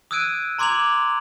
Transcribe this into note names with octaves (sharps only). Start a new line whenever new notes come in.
D#6 E6 F#6 G#6 D7 D#7
A#5 C6 D6 G#6 F7 F#7